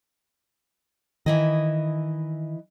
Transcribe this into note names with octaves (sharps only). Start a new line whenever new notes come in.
D#3 E3 E4 D#5